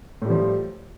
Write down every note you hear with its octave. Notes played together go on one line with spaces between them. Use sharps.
A2 F3 G3